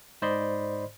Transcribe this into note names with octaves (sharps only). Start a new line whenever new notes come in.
G#2 C5 D5 D#5 B5 C6